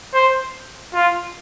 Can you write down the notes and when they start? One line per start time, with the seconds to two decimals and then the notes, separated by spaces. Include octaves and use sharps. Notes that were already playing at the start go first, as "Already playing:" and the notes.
0.14 C5
0.94 F4